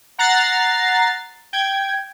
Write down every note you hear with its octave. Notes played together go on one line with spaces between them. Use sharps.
F#5 A#5 F#6 A6 C7
G5 G#6